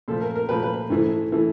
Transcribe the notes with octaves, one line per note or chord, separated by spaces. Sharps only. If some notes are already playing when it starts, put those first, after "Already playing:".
A#2 F3 A3 A4
A#4
A#4
A#2 F3 A3 B4
B4
G#2 E3 A3
E3 A3